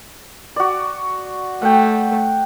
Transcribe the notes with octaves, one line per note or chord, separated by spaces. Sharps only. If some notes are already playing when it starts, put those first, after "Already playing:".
F#4 D5
A3 F#5 G5